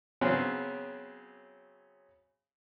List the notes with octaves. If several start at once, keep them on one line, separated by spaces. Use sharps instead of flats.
C#3 F#3 B3 C4 G#4